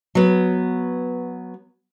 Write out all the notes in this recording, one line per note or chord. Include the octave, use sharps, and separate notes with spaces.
F#3 B3